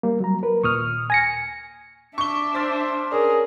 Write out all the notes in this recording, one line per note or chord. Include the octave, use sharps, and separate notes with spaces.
G3 A#3
F#3 A#5
A#4 B4
D#2 A#2 C#6 D#6 F6
G#5 A#6 C#7
D4 E5 C#6 G7
C5 F6 A6 B6
C#4 D4 G#4 A#4